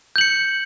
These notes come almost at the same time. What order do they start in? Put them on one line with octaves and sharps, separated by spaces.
G6 F#7 C#7